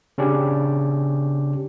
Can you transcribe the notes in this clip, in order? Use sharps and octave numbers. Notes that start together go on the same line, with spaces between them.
C#3 C#4 D4 G4